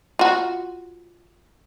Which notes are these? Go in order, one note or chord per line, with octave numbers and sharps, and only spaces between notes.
F4 F#4